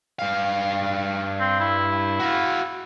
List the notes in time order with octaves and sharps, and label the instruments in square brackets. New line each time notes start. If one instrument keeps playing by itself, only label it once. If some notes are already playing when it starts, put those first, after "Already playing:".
[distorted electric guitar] G2 F5
[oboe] C4
E4
[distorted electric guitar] F#4 F5